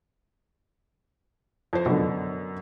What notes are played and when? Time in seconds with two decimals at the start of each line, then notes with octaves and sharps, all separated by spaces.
1.73 F2 C5
1.86 F#2 B2 D3